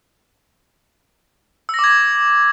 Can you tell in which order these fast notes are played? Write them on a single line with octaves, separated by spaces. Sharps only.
E6 A#6 D6 G#6